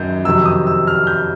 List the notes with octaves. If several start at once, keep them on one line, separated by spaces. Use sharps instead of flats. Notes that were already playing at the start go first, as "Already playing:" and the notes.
Already playing: F#2 D#3 F#3 G6
F2 C3 D#3 F#3 E6
D#6
E6
F6
G6